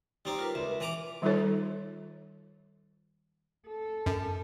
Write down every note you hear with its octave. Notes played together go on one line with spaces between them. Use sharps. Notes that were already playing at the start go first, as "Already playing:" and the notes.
G3 C4 D#4 A#5 D6
F4 A#4 B4
C#2 E5
E3 A#5 D6
D#3 G3 D#4 F4 A4 C#5
A4
F#2